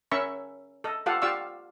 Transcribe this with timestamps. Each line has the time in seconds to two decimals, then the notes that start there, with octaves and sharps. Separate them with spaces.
0.11 C#4 A#4 E5 B5 C#6
0.84 A4 D#5
1.06 F4 G4 A4 F5 F#5
1.22 F4 G4 D5 F5 C#6 E6